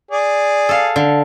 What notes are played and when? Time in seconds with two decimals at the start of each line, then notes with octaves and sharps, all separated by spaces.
0.11 G#4 D5
0.69 A4 F5
0.96 D3